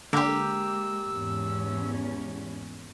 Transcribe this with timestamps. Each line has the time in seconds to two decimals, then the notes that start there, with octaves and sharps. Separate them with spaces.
0.13 D3 G#3 A#3 G4 E6
1.12 E2 G#2 C#4